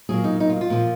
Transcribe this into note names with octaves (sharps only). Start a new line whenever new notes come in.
A#2 F#3 A#3 G#4
D#4
D#4
F4
F4
A#2 F3 A#3